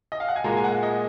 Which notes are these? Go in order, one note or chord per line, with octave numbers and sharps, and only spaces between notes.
D#5
F5
F#5
G#5
A#2 G#3 A#5
G#5
F#5
D#5